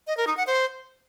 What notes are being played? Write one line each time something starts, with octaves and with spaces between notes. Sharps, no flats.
D#5
A#4
D#4
F#5
C5